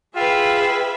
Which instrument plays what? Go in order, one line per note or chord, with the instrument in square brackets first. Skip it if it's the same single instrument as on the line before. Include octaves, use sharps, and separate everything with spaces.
[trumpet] F4 [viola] G#4 [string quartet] B4 E5 [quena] G5